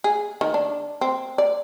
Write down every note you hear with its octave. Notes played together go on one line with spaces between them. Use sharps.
G#4
D#3
D4
C4
D5